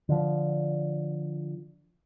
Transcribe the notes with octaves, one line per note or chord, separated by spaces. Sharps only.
D3 F3